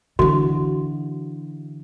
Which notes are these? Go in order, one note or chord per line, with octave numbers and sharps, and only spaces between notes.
D3 E3 F#4